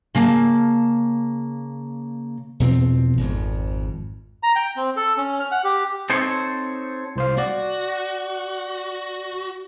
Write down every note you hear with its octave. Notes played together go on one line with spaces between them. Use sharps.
C#3 A#3 A5
E2 B2 F3 C4
G#1 F2
A#5
G5
C4
A4
C#4
F6
F#5
G4
C4 D#4 A4 C5 C#5
C2 C5 F5
F#4 D5